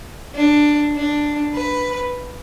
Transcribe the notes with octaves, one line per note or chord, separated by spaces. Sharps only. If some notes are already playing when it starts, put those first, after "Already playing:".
D4
D4
B4